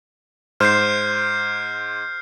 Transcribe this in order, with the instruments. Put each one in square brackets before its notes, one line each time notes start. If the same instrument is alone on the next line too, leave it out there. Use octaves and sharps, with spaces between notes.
[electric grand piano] G#2 C5 [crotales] F6 G6 C7